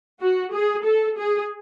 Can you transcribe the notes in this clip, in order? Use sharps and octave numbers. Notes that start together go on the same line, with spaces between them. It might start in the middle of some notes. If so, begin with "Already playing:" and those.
F#4
G#4
A4
G#4